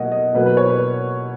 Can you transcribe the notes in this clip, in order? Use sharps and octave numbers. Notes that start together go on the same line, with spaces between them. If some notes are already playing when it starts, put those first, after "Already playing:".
Already playing: B2 F#3 A#3 D#5 F#5
D#5
B2 F#3 A#3 B4
B4
C#5
B4